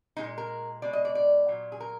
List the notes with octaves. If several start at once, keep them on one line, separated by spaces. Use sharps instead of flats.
A#2 G#3 D#4
A#4
B2 G#3 D5
D#5
D5
D5
A#2 F#3
G#4
A#4